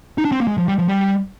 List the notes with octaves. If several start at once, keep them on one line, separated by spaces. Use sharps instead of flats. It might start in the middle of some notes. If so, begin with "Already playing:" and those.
D#4
D4
C4
A#3
G#3
F3
G3
F3
G3